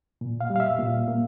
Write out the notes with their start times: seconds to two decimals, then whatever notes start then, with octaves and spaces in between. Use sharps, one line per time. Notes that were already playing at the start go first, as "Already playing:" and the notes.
0.21 A#2
0.41 F5
0.50 G3
0.56 F5
0.60 E5
0.79 A#2
1.08 A#3